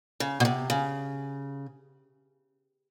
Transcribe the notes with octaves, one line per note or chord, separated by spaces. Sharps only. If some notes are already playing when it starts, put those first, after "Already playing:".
C#3
B2
C3
C#3